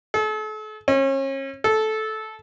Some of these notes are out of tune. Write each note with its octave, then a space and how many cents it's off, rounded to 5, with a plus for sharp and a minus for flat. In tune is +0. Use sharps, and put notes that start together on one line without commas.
A4 -40
C#4 -35
A4 -15